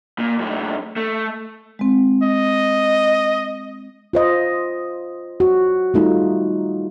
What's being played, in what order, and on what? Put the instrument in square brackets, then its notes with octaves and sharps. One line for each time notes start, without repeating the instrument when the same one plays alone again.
[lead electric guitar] A#2
F#2 A2
A3
[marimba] G#3 C4
[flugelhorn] D#5
[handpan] F4 C5 D#5
F#4
G3 A3 D#4 F4